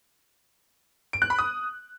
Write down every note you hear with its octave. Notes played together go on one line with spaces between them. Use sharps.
D7
F#6
B5
D#6